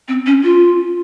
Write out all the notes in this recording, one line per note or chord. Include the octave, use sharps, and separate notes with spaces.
C4
C#4
F4